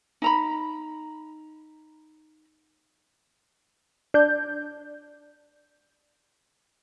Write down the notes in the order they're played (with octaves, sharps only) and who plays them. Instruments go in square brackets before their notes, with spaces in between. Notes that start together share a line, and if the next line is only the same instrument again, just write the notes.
[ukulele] D#4 A#5 B5
[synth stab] D4 G6